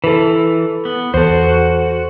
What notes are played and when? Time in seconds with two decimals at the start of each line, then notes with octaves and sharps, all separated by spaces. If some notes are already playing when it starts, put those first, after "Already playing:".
0.04 E3 A4 B4
0.85 B3
1.14 E2 F#4 A4 C5